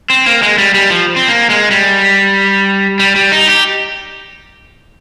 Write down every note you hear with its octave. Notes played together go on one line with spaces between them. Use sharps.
C4
A#3
G#3
G3
G3
F3
C4
A#3
G#3
G3
G3
G3
D#4
G4